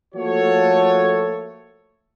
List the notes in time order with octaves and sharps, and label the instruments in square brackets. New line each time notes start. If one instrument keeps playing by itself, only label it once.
[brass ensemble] F3 A3 A#3 F#4 A4 C#5